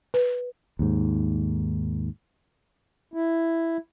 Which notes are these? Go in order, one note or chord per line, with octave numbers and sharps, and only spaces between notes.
B4
D#2 G#2
E4